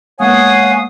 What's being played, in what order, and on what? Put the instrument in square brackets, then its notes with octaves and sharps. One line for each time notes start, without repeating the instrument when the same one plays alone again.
[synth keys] G#3 A#3 B3 [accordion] C#5 F#5 G#5 [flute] F5 [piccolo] D#6